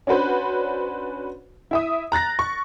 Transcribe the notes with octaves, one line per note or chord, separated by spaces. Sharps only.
C#4 D4 F#4 B4 C5
E4 E5 D#6
A#5 F#6 A6 A#6
C#6